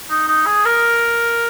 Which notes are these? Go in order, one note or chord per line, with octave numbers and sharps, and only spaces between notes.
D#4
D#4
G#4
A#4